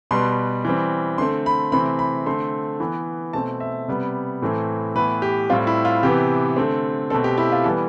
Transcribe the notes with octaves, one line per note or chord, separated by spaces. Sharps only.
B2 G3 B3 C6
E3 G3 C4
D3 A3 C4 C6
B5
C3 E3 A3 C4 B5
B5
D3 A3 C4 C6
E3 B3
B2 A3 C4 A5
E5
C3 G3 B3
A2 E3 A3 C4
A2 E3 B3 B4
G4
A2 G3 C4 F4
E4
F4
C3 E3 B3 G4
D3 A3 C4
B2 A3 C4 A4
G4
E4
F4
E3 G3 B3 A4